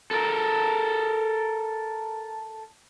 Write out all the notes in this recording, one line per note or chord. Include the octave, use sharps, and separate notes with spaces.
A4 A#4